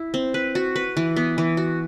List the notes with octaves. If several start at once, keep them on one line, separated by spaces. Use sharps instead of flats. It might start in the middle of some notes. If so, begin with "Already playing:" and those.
Already playing: E4
C4
B4
F#4
B4
E3
B3
E3
F#4